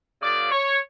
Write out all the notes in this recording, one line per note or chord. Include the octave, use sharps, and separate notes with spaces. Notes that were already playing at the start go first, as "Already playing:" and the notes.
C#3 F#3 A#3 D5
C#5